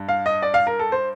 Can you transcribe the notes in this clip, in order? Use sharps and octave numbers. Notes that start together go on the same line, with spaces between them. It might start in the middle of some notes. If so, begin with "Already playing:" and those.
Already playing: G2
F5
D#5
D5
F5
A#4
A4
C5